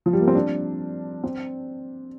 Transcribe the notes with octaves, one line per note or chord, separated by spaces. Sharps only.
F3
G3
A#3
C4
D4
C4